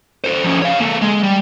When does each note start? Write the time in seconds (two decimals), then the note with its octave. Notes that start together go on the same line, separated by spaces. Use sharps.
0.24 A4 C5
0.44 F3 C#4
0.62 C#5 F5
0.80 A#3 A4
1.02 G#3
1.23 G3